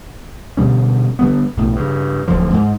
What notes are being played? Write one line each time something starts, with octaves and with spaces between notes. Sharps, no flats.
B2 D3 G3 C#4
D3 G3 B3
B1 A2
G2 C#3
D1 F#2 D3 F3
G#2